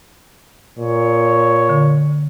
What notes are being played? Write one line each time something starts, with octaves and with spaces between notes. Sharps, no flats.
A#2 C#5
D3